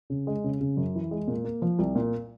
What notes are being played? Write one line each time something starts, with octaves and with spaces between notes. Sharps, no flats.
C#3
G#3
C#3
C#3
F#2
E3
G#3
A#2
A#3
F3
C2
A#2